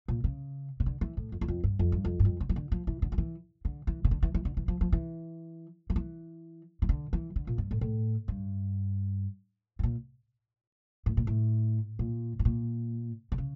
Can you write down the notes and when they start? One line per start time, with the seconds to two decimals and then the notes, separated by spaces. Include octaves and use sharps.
0.08 A#2
0.24 C#3
0.80 C#3
0.86 D3
1.01 E3
1.17 A2
1.32 F2
1.41 E2
1.48 F2
1.64 G2
1.79 F2
1.92 G2
2.05 F2
2.20 G2
2.25 F2
2.40 D3
2.49 E3
2.56 D3
2.72 F3
2.87 E3
3.02 D3
3.12 F3
3.18 E3
3.65 D3
3.87 E3
4.05 C#3
4.11 D3
4.23 E3
4.34 E3
4.45 D3
4.57 E3
4.68 F3
4.81 F3
4.92 E3
5.90 F3
5.96 E3
6.82 E3
6.89 D3
7.13 E3
7.36 D3
7.47 A#2
7.58 G2
7.71 A2
7.81 A2
8.28 G2
9.79 A2
9.83 A#2
11.06 A2
11.17 A#2
11.27 A2
11.99 A#2
12.39 A2
12.45 A#2
13.32 D3
13.38 C#3